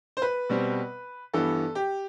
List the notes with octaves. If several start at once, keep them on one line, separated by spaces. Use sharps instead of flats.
C5
B4
B2 G3 C4
G2 E3 B3 A4
G4